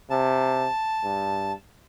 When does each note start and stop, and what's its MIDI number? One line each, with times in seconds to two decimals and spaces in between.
0.10 0.68 48
0.10 1.52 81
1.04 1.54 43